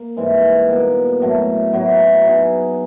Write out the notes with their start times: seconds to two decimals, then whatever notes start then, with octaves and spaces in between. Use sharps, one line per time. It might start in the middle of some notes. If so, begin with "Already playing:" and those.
Already playing: A#3
0.17 G#2 E3 G3 C4
0.69 B2 G3 A#3
1.21 A2 F#3 A3
1.73 A2 F#3 B3 E4
2.25 F#3 B3 D#4 G#4